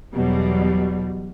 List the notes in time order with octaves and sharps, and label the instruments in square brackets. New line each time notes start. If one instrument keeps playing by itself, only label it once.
[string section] E2 B2 F#3 G3